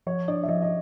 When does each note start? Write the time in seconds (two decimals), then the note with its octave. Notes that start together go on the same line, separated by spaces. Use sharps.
0.07 F3 C#5
0.28 D4 D5
0.43 E5
0.49 F3 D#5
0.62 D#5